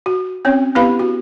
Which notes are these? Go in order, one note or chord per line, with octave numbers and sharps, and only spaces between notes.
F#4
C4 C#4 C#5
B3 E4 G4 B4 F5 B5
F#4